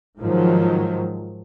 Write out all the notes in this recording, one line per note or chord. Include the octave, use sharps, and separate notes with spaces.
G#2 D#3 F3 F#3